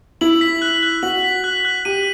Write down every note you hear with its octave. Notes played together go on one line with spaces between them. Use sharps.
E4 F#7
B6
F#6
F#6
F#4 F#7
B6
F#6
F#6
G4 D#7